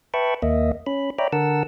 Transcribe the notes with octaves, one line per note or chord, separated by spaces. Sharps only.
B4 E5 G5 A5 B5 C#6
D#2 A#3 D#5 E5
C#4 B5
C#5 D5 E5 G5 A#5 B5
D3 A#4 F#5 A5 E6